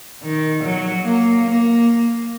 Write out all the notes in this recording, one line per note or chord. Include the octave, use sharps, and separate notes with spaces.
D#3
F#3
A#3
A#3